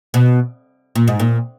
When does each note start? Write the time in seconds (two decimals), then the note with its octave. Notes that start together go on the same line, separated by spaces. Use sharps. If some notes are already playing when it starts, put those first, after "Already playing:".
0.14 B2
0.95 A#2
1.08 G#2
1.20 A#2